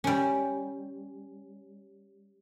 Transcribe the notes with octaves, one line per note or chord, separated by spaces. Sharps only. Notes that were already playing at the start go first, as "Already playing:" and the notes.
G3 C#4